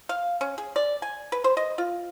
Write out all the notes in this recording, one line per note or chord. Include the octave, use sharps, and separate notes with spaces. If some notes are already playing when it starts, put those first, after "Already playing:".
F5
C#4
G#4
D5
G#5
B4
C5
D#5
F4